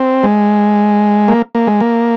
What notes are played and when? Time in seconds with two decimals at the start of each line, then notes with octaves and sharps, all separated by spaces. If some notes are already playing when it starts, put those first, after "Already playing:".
Already playing: C4
0.23 G#3
1.28 A#3
1.55 A#3
1.67 G#3
1.81 A#3